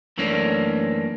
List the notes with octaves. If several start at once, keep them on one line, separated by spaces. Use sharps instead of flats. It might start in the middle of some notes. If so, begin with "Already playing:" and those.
F#2 E3 A3 A#3 C#4 D4